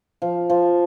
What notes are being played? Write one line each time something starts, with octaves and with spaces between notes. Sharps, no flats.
F3
F3